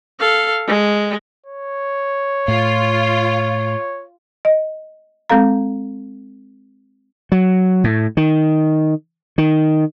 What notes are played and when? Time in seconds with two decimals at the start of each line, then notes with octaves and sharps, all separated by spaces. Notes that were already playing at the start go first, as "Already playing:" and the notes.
0.20 A4 F5
0.67 G#3
1.46 C#5
2.48 A2 F4
4.45 D#5
5.30 G#3 C4 A4 F5 A#5
7.32 F#3
7.84 A2
8.17 D#3
9.38 D#3